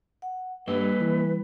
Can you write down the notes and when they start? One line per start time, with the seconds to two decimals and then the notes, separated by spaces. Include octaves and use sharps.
0.22 F#5
0.68 G2 G3 A#3 A4 B4 D#5
1.01 E3